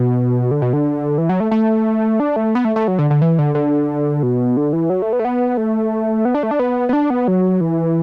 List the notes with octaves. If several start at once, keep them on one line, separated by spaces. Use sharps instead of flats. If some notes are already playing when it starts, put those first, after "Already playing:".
Already playing: B2
D3
B2
D3
E3
F#3
A3
A3
D4
A3
B3
A3
A3
F#3
D3
D3
E3
D3
D3
B2
D3
E3
F#3
A3
B3
A3
B3
A3
B3
D4
A3
D4
B3
B3
D4
B3
F#3
E3